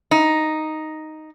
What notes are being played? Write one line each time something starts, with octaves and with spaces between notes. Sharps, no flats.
D#4